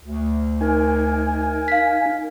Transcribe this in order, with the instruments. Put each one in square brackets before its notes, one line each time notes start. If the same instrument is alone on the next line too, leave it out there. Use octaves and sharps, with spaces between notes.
[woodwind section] D2
[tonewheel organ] D#4 G#5 [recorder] A#4
[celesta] F5 B6